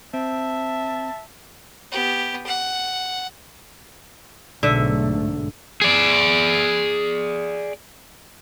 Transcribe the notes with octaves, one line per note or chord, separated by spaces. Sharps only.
C4 E5 A5
B3 G4
F#5
B1 G#2 D3 A3 E5
G#4 D5